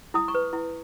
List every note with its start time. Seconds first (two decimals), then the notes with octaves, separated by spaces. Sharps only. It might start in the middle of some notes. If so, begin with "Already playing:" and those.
0.14 E4 D#6
0.28 C#6
0.35 B4
0.53 E4